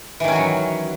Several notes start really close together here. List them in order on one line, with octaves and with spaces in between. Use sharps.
E3 D#3 C#4 F#4 F#3